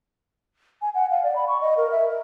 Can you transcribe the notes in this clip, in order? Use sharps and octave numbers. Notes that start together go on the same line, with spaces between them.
G#5
F#5
F5
D5
B5
C#6
D#5
A#4
E5
A#4